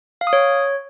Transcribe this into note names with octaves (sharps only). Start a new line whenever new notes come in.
F5
D#6
C#5